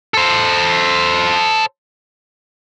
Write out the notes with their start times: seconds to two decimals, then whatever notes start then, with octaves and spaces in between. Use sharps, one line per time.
0.14 A4 C5